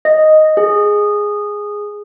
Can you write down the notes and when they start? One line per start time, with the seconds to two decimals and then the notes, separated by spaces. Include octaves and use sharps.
0.05 D#5
0.57 G#4